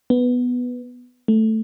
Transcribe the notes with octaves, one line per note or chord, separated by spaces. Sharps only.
B3
A3